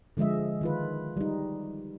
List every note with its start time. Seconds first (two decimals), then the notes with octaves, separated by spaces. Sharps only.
0.17 D3 F3 G#3 D#5 E5
0.61 D#3 F4 B4
1.17 G3 D#4